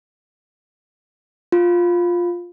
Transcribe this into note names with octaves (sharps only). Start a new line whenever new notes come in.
F4